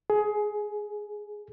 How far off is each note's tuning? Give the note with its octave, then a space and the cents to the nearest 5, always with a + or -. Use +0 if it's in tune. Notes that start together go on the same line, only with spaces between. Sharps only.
G#4 +20